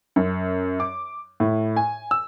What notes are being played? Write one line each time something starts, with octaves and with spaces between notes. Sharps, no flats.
F#2
D6
A2
G#5
E6